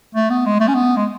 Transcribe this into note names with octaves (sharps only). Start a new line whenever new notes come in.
A3
B3
G#3
A3
C#4
B3
G#3